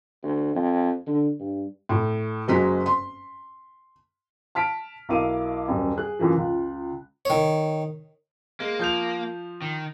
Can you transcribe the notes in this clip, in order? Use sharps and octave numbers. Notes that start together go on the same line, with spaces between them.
D2
F2
D3
G2
A2
F#1 F#3 G#3 B6
C6
A5 F6 B6 D7
B1 E4 A#4 F5 D6 D#7
D#1 F#2
G#4 F#6
F#2 A#2 E3 F3
C#2 F4
D#3 C#5
G#3 A#3
F3 G6 F7
D#3